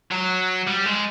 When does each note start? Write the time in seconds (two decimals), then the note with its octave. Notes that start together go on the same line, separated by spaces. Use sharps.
0.11 F#3
0.67 G3
0.86 G#3